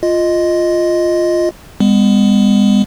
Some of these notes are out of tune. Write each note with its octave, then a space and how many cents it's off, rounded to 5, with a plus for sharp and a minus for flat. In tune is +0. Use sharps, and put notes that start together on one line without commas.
F4 +0 D#5 +0
G#3 -45 B3 +15